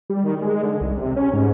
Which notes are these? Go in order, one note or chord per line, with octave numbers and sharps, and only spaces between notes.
G3
D#3
G#3
D3
C2
C3
C#4
G#2